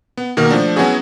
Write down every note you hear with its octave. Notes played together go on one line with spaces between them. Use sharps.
B3
B2 D#3 A#3 A#4
F3 A3 D4
F#3 B3 C#4 E4 F#4 G#4